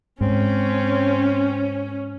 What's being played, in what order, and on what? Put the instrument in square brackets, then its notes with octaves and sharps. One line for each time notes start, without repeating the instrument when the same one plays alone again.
[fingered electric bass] G#2 [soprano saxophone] C4 [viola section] C#4